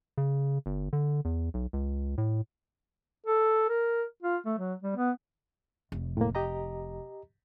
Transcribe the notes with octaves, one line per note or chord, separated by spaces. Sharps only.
C#3
G1
D3
E2
B1
C#2
A2
A4
A#4
F4
A3
F#3
G3
B3
F1
A2 A#3
G4 D#5 A#5